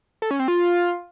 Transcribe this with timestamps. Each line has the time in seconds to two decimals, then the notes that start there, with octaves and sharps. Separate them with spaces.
0.22 A4
0.31 C#4
0.39 C4
0.48 F4